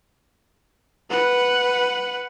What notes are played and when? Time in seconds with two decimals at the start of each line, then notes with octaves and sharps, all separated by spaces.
1.10 B4 F#5